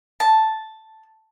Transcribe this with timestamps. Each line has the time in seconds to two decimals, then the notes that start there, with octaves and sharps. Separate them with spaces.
0.20 A5